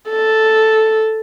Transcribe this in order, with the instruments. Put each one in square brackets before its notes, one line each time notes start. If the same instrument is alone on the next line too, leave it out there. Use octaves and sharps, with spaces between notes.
[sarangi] A4